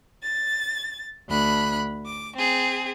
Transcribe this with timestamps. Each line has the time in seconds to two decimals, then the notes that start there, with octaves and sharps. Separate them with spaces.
0.23 A6
1.29 D2 B5 F#6
2.06 D6
2.35 C4 G#4